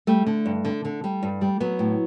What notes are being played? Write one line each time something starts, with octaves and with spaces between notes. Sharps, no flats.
G3 A3
D3
G2
D3
D3
G3
G2
G3
F#3 B3
A2